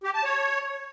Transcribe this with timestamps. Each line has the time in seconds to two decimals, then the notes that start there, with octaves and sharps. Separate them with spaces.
0.04 G4
0.14 A5
0.24 C#5